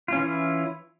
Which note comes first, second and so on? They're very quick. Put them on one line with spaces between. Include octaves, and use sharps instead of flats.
F4 C#4 E3 E4